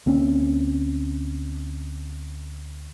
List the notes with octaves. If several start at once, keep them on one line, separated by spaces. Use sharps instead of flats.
D2 A#3 C4 C#4